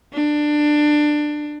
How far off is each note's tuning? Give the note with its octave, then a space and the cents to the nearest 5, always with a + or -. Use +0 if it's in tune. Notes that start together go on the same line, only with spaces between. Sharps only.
D4 +15